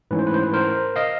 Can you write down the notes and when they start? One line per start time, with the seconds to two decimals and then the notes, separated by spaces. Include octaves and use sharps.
0.11 G#2 E3 A3 C#4 E4 B4
0.19 C5
0.27 B4
0.34 C5
0.43 B4
0.53 A#4 C5
0.96 D#5 F5